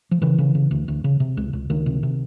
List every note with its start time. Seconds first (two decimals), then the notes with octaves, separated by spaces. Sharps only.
0.11 F3
0.22 C#3 E3
0.39 C#3
0.55 C#3
0.71 D2
0.88 D2
1.04 C#3
1.20 C3
1.37 C#2
1.53 C#2
1.70 C#2 D#3
1.86 C3
2.03 C3